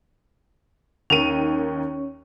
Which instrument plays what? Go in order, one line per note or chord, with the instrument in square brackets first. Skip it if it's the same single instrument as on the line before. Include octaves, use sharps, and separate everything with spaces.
[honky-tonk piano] D#2 D#3 D#7 [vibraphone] C#4 C#5